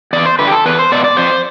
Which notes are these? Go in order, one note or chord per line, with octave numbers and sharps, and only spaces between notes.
E2 D5
C5
D3 B4
G4
A4
E2 B4
C5
B2 D5
D5
F2 C5